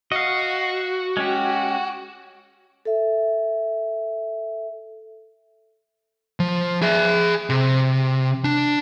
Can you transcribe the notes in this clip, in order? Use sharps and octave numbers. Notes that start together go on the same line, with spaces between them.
F#4 D#5 F5
G#3 C#4 G4
A4 E5
F3
G#4 E5
C3
D4